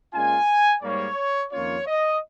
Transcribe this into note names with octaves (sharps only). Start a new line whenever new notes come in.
A#2 G#3 C#4 F4 G#5
G#2 G3 A#3 C#5
F2 D#3 A#3 C#4 F4 C#5
D#5